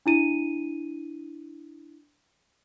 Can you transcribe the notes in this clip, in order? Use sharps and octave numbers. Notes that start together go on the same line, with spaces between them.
D4 E4 D#7